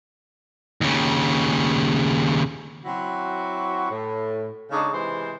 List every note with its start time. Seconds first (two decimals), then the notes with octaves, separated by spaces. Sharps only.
0.81 D#2 C#3
2.85 F#3 C4 E4 F#4
3.90 A2
4.71 C#3 G#3 D4 D#4 G#4 C#5
4.92 C3 E3 G#3 C5